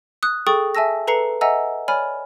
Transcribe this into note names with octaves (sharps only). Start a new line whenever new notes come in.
D#6 F#6
G#4 A4 G5 C#6 D#6 A6
E5 G#5 A5 E6 A#6
A4 B4 A#5 C7 C#7
D#5 E5 F#5 G#5 A#5 E6
C#5 D5 G#5 B5 F6